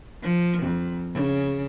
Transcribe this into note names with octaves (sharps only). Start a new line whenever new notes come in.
F3
F2
C#3